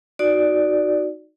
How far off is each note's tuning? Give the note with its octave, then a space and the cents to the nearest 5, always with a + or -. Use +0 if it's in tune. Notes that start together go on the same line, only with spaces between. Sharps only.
D#4 +0 F#4 +0 D5 +0